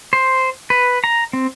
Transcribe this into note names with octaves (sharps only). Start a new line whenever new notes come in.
C5
B4
A#5
C4